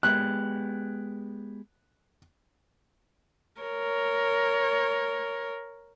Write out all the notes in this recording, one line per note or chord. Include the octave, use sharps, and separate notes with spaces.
G#3 B3 G4 F#6
A#4 C#5